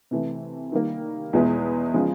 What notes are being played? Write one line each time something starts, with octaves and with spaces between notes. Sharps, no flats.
C3 E3 A3
D#3 G3 A#3
E2 B2 G#3 B3 E4
C#3 F3 G#3